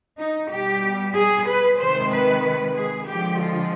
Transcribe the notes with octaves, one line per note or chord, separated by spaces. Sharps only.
D#4
B2 G3 G4
G#4
B4
C3 D#3 G#3 C5
B4
G#4
D3 F3 G#3 G4
F4